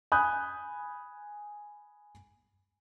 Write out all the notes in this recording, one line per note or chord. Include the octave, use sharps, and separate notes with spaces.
G#5 B5 D#6 F#6 G6